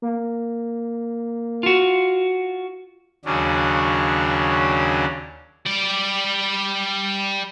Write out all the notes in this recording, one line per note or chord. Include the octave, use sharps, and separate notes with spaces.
A#3
F4 F#4
D#2 C#3 F#3 C#4 D4
G3 D5